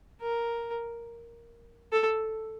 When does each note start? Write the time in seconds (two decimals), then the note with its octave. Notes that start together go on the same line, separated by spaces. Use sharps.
0.21 A#4
1.92 A4